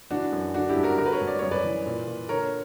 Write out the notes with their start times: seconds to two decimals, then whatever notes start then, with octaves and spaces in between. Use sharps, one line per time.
0.11 E3 D4 F#4
0.32 F#2
0.54 D3 D4 F#4
0.69 E4 G4
0.76 G2
0.83 F#4 A#4
0.98 D3 F#4 A#4
1.06 B4
1.13 A#4 C#5
1.21 G2
1.28 D5
1.39 F#2 C#5
1.51 B4 D5
1.64 E3
1.86 A#2
2.07 A#2
2.29 D3 A#4 C#5